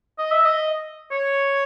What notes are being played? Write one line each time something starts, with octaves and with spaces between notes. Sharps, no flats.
D#5
E5
D#5
C#5